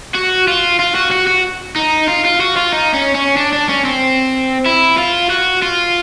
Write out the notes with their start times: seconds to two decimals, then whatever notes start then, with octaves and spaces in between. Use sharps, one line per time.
0.15 F#4
0.48 F4
0.79 F4
0.95 F#4
1.12 F#4
1.27 F#4
1.76 D#4
2.07 F4
2.25 F4
2.40 F#4
2.56 F4
2.73 D#4
2.94 C#4
3.15 C#4
3.37 D4
3.53 D4
3.69 C#4
3.85 C4
4.66 E4
4.97 F4
5.30 F#4
5.62 F4